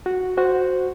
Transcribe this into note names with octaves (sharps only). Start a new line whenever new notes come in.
F#4
F#4 C5